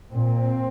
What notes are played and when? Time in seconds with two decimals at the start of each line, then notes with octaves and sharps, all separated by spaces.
0.12 A#2 C4